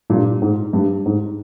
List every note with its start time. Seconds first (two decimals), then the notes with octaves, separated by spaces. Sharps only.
0.10 G2 A#2
0.42 G#2
0.73 G2
1.06 G#2